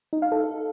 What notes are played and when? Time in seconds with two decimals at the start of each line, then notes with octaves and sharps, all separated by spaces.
0.13 D#4
0.22 F5
0.32 A4